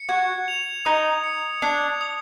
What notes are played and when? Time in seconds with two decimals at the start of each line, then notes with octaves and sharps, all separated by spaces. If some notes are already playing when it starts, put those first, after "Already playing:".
Already playing: C#7
0.09 F#4 G#6
0.48 F7
0.85 D#4 D#6
1.24 C#7
1.62 D4 G#6
2.01 D#6